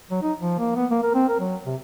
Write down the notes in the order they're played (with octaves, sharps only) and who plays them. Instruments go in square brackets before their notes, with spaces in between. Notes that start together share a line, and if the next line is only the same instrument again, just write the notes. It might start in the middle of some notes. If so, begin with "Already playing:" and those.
[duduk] F#3
D#4
F3
A#3
B3
A#3
A#4
C4
A#4
F#3
C3